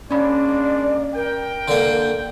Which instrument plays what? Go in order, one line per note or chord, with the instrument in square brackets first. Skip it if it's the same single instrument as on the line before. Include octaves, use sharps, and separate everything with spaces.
[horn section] G#3 A#3 D4 [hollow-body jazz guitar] C#4 B5 [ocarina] D5
[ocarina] A#4 [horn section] G5
[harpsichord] D3 A#3